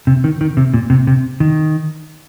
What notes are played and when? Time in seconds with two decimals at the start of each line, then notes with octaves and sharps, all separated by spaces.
0.07 C3
0.24 D#3
0.41 D#3
0.57 C3
0.74 A#2
0.90 C3
1.07 C3
1.40 D#3